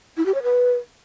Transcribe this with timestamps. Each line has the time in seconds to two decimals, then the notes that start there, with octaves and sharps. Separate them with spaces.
0.17 E4
0.26 G4
0.34 C#5
0.43 B4